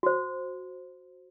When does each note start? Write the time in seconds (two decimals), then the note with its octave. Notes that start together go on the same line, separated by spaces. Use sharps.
0.03 F#4 C5